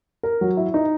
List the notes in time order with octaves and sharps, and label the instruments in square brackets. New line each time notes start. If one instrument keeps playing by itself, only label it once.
[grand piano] A#4
F#3
E4
D#4